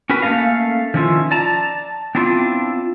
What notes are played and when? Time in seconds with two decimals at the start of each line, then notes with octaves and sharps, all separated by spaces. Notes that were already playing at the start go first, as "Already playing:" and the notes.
0.09 C#4 F#4 A#4 B4
0.22 A3 A#3 C#4 A4 D#5 F5
0.94 D#3 F3 C#4 E4 F4
1.31 D5 A5 A#5
2.15 B3 C4 D4 E4 F4